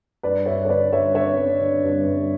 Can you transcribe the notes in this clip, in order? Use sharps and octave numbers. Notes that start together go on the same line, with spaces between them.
G2 B4 D5
G2 C#5 E5
C#5
D3 B4 D5
G2 C#5 E5
D3 C#5 E5
D3
D3
G2
G2